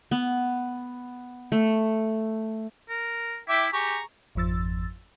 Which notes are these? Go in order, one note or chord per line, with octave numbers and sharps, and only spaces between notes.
B3
A3
A#4
E4 E5 G5 D6
G4 G#4 A#5 C#6
G#1 F2 F3 E6 A6